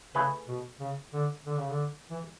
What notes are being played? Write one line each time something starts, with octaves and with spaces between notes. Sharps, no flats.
C#3 A3 E4 G#4 B4
B2
C#3
D3
D3
C#3
D3
E3